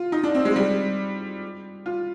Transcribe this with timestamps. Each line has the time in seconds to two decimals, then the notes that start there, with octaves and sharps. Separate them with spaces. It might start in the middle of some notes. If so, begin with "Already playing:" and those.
Already playing: F4
0.12 D#4
0.24 D4
0.35 C4
0.45 G#3
0.56 G3
1.86 F4